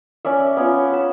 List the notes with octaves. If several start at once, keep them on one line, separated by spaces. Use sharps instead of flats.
C#4 D5 E5
B3 C#4 F4
B5 E6